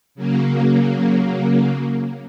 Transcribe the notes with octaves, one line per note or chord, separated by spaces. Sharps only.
C#3 F#3 A#3